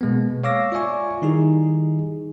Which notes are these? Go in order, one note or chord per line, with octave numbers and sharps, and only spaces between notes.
B2 G#3 A#3 B3
C#5 F5 D6 E6 A#6
F4 D5 E5 G#5 C#6
D#3 G3 D#4 E4 G4 G#4